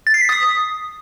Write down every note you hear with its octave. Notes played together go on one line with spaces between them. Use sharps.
A6
C7
B6
D#6